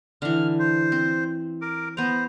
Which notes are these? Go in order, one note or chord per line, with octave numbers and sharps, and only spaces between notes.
D3 E3 F6
C5
C4
A#4 D6
B3 C5 A#5